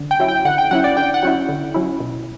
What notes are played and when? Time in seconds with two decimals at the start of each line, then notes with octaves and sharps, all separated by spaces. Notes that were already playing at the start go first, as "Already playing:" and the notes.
Already playing: D3
0.11 G5
0.20 F#3 C#4 E4
0.28 G5
0.45 D3 F#5
0.58 G5
0.71 F#3 C#4 E4 F#5
0.84 D5
0.97 D3 G5
1.14 F#5
1.23 F#3 C#4 E4
1.49 D3
1.74 F#3 C#4 E4
2.00 B2